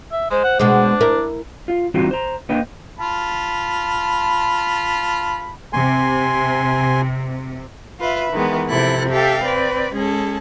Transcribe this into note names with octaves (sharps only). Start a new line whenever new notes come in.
E5
G#3 C5
F#5
B2 G#3 D4
E4 A#4
F4
E3 G3 C4 D#4 F4 F#4
C5 A#5
A#3 D4 B4 D#5 G5
F4 A5 B5
C3 G#5 C6
F4 B4 E5
D#3 E3 G#3 B3
C3 F3 E4 A4 F#6
G4 A4 E5 F5 G5
C4 B4 D5
G#3 C#4 G#4 A4